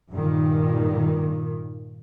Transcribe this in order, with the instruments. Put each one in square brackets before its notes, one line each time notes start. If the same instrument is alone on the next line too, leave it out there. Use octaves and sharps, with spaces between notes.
[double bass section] G2 A#2 D#3